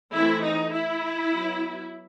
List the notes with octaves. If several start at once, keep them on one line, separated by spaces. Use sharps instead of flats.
E3 A3 C4 E4
D#4
E4
F#3 B3